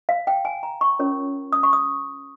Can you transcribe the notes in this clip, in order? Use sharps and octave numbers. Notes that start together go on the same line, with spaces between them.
F5
G5
G#5
A#5
C#6
C#4 F4 A#4 C#5
D#6
C#6
D#6